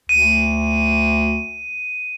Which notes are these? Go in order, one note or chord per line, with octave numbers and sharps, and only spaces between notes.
D2 D#7